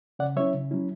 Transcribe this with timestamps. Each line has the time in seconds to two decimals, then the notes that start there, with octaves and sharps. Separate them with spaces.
0.19 C#3 D5 F#5
0.36 F#3 C#4 E4 C#5 E5
0.54 C#3
0.71 F#3 C#4 E4